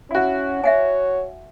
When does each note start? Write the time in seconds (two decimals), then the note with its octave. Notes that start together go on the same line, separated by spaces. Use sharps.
0.11 C#4 E4 F#4
0.64 C#5 E5 F#5 G#5